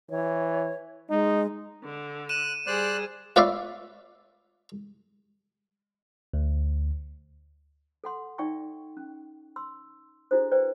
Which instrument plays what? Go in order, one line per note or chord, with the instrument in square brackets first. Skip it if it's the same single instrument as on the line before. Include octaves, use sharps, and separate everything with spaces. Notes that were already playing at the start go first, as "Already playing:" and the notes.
[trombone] E3 [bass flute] C#5
[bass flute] G#3 [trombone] D#4
[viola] D3
[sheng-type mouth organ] F#6 [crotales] D#7 E7
[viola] G3 G#4 [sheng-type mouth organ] C5 D5 F#6
[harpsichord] F4 B4 C#5 D5 E5 F5
[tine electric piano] D2
[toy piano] A4 F#5 C6
D#4 D5 E5 G5 C#6
C#4
C6 E6
D4 E4 F#4 G#4 A4 C5
B4 C5 D5 G5